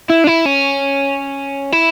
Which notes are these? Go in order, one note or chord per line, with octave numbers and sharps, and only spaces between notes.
E4
D4
E4
C#4
E4